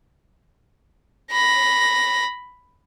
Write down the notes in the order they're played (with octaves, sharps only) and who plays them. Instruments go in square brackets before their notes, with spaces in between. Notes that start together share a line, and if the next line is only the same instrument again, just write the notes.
[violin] B5 A#6